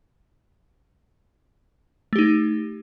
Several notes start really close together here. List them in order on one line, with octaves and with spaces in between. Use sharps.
A3 G4 D#4